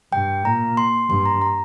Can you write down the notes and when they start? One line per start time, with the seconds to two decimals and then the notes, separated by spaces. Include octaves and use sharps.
0.12 G2 G5
0.45 A#2 A#5
0.77 C6
1.09 G2 C6
1.26 A#5
1.42 A#5